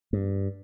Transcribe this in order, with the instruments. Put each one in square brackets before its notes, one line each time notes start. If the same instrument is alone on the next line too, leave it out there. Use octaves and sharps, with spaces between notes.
[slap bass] G2